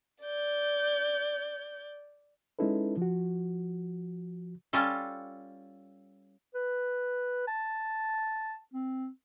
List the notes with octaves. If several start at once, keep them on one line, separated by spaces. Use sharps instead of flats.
D5 G6
G#3 C#4 D#4 E4 A4 B4
F3 F#4
G3 C#4 F4 A4
B4
A5
C4